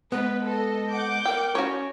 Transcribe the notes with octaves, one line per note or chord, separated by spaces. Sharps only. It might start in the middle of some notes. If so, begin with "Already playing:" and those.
G#3 B3 B4
A4 D#5
F#5 D6 G6
A#4 G5
C#4 F#4 C#5